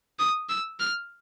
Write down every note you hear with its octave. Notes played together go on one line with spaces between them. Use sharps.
D#6
E6
F6